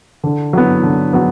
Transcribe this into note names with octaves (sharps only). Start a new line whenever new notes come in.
D3
F#3 B3
D3
F#3 B3